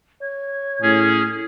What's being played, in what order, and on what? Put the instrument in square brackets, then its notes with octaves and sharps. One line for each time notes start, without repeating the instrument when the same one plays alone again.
[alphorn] C#5 [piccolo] G#6
[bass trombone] A2 [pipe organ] C#4 G#4